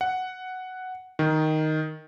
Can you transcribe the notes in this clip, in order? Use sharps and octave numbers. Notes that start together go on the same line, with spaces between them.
F#5
D#3